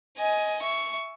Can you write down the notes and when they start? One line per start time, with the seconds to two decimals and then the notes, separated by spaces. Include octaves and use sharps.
0.18 D#5 G#5
0.62 E5 C#6